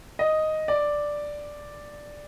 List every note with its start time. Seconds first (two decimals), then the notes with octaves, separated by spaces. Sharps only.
0.19 D#5
0.68 D5